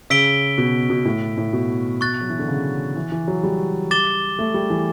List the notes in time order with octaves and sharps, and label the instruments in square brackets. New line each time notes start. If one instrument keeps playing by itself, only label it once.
[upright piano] C#3 [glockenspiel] E6 B6 D7 G7
[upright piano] B2
B2
A2
A2
B2
[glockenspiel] C#6 F#6 A6
[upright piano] F#3
E3
D3
C#3
E3
E3
F#3
G3
[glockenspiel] D6 A6 E7 G7
[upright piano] A3
G3
E3